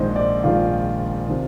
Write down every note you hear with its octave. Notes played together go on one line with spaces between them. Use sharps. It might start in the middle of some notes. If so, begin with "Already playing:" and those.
Already playing: A#1 G#2 D#3 C5 D#5
D5
A#1 G#2 D#3 F4
C3 D#3